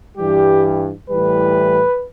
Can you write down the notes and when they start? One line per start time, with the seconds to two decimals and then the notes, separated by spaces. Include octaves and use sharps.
0.18 G2 E3 G3 G4
1.09 A2 E3 G3 B4